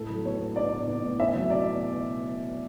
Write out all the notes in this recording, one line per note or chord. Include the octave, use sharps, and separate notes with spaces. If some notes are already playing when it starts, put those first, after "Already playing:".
Already playing: A2 A4
F#3
B3 C#5
B3
D4 D5
A2
B3
A2
C#4 E5
F#3
B2 D5